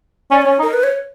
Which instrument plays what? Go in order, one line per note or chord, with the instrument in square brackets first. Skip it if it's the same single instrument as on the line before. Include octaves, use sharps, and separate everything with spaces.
[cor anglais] C#4 [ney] D5
[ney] C#5
[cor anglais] C#4
D#4
[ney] A#4
B4
C#5